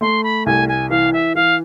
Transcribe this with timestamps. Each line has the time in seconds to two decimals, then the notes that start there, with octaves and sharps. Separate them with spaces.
0.01 A3 C6
0.24 B5
0.46 C2 G#5
0.69 G#5
0.90 E3 F5
1.13 E5
1.35 E3 F5